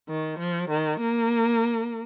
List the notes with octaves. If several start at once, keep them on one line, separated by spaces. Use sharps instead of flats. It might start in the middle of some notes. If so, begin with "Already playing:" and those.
D#3
F3
D#3
A#3